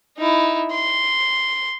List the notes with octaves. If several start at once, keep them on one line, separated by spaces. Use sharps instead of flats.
D#4 E4
C6